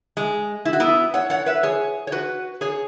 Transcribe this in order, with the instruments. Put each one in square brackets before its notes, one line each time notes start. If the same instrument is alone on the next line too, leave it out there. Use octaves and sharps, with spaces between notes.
[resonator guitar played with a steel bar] G#3
E4
F#4
B3 E4
C#5 F#5
C#5 F#5
B4 E5
G#4 C#5
C#5
F#4 B4
G#4 C#5